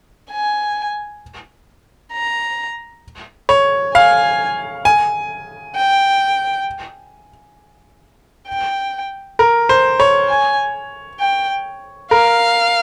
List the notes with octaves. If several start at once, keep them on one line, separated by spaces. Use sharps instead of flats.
G#5
A#5
C#5
F5 G#5
G#5
G5
G5
A#4
C5
C#5
G#5
G5
A#4 F5